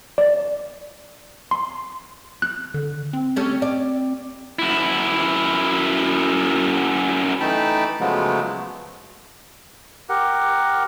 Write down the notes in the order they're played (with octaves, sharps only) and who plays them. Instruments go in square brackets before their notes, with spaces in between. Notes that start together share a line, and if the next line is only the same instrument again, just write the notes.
[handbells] D5
C6
F#6
[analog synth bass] D3
C4
[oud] A3 C#4 G4
D5
[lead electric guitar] F#2 E4
[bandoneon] E3 A3 D#4 G5 A5 B5
C#3 F3 F#3 G#3 A3 B3
[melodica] G4 A#4 F#5